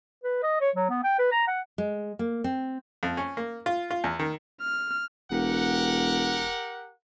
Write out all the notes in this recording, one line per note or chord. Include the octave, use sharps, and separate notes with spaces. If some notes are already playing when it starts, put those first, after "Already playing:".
B4
D#5
C#5
F#3
B3
G5
B4
A#5
F#5
G#3
A#3
C4
F2
C#4
A#3
F4
F4
E2
D#3
F6
E1 G4 A#4 F#5